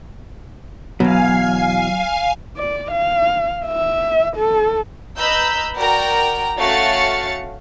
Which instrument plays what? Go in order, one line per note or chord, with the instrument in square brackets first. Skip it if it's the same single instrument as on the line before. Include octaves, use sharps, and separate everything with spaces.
[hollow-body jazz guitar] E2 B2 [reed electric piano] F#3 [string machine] F5 G#5 C7
[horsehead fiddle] D5
F5
E5
A4
[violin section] B4 D#5 A#5 B5 E6 G6
F#4 A#4 D5 G5 A#5
A3 C#4 F#4 F5 A6 C#7